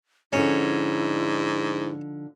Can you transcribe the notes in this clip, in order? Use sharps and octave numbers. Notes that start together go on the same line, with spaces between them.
G#2 D3 F3 C#4 D#4 E4